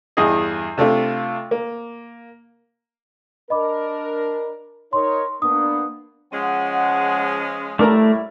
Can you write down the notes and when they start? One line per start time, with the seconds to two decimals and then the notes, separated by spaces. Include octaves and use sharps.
0.17 E2 G2 G#4 D#5
0.78 C3 A3 D4 F4
1.51 A#3
3.50 D4 A#4 D#5 B5 D6
4.93 D#4 A#4 C#5 C6
5.42 A#3 B3 D4 D#6
6.32 F3 G#3 C#4 F#5
7.79 G3 A3 D4 E4 A#4 C#5 A#5